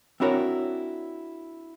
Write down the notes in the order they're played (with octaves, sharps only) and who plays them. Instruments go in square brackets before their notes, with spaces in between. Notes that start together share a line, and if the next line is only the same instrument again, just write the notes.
[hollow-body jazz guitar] C4 D4 E4 F#4 A#4 C#5